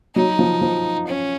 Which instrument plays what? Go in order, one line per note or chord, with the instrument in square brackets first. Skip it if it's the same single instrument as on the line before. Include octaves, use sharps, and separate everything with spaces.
[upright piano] F#3 [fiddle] D#4
[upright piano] F3
F3
[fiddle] C#4